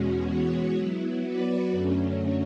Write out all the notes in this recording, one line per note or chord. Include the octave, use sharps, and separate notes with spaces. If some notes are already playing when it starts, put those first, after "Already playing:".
Already playing: E2 B2 G#3 C#4 F#4
E3 G#3 B3 F#4 C#5
F#3 B3 E4
F#3 B3 F#4 B4 D5
F#2 D3 F#3 A3 C#4